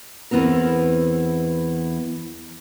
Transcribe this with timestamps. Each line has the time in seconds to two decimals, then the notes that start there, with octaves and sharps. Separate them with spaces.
0.31 E2 E3 B3 C4 A#4